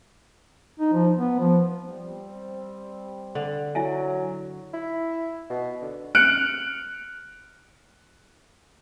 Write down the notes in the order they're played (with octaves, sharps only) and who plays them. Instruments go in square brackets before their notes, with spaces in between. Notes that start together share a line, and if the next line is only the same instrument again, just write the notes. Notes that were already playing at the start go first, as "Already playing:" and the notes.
[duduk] D#4
F3
B3
F3
[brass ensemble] G3 C4
[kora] D3
[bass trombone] F#3 [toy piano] E4 E5 G#5
[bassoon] E4
B2
D3
[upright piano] F6 F#6 C#7 D7